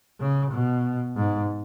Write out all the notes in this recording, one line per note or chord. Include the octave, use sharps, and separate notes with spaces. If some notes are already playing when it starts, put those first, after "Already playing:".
C#3
B2
G#2